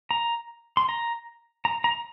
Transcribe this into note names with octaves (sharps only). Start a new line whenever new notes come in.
A#5
C6
A#5
A#5
A#5